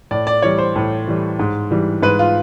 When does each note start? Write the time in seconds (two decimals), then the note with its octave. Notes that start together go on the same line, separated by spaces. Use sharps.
0.11 A2 D5
0.27 D5
0.42 E3 G3 C#5
0.58 C5
0.76 A2
1.08 E3 G3
1.39 G#2
1.71 E3 G3
2.02 G#2 B4
2.19 F4